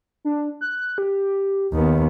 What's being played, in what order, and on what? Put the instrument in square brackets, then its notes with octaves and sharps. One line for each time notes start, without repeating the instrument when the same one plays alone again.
[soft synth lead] D4
F#6
G4
[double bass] D#2 B3